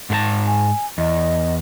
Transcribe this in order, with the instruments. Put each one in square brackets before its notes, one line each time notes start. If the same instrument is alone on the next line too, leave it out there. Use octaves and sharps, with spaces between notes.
[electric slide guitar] G#2 G#4 A5
[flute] G#5
[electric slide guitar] E2 [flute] D#5